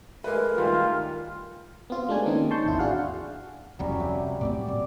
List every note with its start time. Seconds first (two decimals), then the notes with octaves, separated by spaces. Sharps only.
0.24 G#3 A3 A#4 B4
0.57 D2 D#3 G3 F4
1.90 B3 C4 F4
2.09 G#3 A3 D4 G4 G#5
2.26 D#3 A#3 C4 C#4 D#4
2.51 A5 C6 C#6 G6
2.66 A1 E2 E4
2.79 D4 F#4 G#4 F5 F#5
3.79 D1 C2 F2 F#3 G3 C#4
4.00 C3
4.41 A2 A3 C4 D5
4.68 A#2